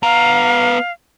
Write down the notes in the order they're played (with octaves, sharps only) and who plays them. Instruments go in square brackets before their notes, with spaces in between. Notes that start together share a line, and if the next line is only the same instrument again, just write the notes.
[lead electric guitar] B3 A#5 [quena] F5